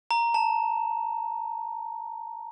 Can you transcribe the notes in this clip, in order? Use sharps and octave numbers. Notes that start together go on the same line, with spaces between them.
A#5
A5